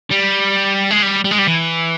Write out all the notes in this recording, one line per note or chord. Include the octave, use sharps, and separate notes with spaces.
G3
G#3
G3
G3
G#3
G3
E3